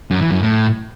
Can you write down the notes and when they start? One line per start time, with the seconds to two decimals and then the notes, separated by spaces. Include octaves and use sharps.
0.11 F#2
0.21 E3
0.31 F#2
0.41 A2